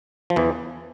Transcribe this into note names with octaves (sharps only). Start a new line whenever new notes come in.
F3
E2 E3